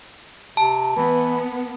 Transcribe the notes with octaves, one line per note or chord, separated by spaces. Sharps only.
C3 A5
E3 B3